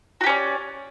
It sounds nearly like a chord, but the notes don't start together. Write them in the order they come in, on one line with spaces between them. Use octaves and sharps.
F#4 G4 C#4 D5